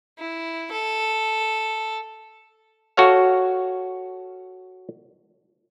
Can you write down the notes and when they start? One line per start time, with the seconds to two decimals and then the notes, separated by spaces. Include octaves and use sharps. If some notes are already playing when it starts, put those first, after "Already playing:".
0.19 E4
0.72 A4
2.97 F#4 A4 C#5 F5